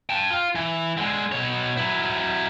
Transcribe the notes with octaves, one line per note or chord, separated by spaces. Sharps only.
G5 A5
F4
E3
D3 G#3
B2 C#5
F#3 E4